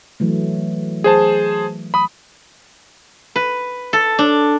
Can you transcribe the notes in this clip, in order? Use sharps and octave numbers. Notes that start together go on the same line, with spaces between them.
E3 F#3 A3
G#4 C5 A5
B5 D#6
B4
A4
D4